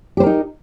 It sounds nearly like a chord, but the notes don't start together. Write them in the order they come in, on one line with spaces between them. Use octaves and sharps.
G4 C5 A#4 D#4